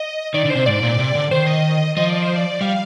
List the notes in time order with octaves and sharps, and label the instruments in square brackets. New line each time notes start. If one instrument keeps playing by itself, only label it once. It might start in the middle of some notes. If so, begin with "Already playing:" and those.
Already playing: [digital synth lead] D#5
[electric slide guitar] D#3 [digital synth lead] D5
[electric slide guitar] D3
[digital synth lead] C5
[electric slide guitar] C3
[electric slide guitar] G#2 [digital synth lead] D5
[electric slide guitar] A#2
C3
D3
[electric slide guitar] D#3 [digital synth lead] C5
[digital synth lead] D#5
[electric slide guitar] F3 [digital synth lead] D#5
[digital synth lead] D5
C5
D5
[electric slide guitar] G3 [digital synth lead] F5